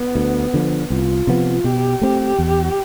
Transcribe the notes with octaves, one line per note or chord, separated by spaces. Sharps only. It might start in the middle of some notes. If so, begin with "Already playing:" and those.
Already playing: B3
D2
D3 F3
C2 F4
C3 F3 B3
B2 G4
A3 C4
E2